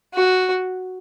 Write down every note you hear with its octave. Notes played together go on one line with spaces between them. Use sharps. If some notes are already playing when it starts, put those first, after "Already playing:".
F#4